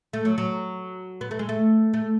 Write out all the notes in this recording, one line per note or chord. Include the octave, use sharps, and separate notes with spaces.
A3
F#3
F#3
B3
A3
G#3
A3
A3